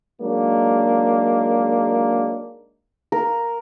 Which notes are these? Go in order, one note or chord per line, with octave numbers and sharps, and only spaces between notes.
F#3 G#3 A#3 D4 D#4
A#4